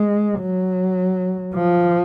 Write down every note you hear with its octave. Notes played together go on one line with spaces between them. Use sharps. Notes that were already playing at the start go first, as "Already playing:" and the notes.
Already playing: G#3
F#3
F3